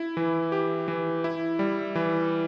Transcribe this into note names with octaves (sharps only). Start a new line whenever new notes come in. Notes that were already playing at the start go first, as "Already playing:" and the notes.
Already playing: E4
E3
G4
E3
E4
G3
E3